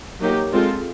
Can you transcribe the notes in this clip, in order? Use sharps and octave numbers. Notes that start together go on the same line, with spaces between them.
F#3 A#3 D#4 G4
G#3 C4 F4 A4